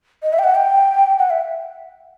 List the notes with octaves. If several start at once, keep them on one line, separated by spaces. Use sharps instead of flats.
D#5
E5
G5
F#5
G5
F#5
E5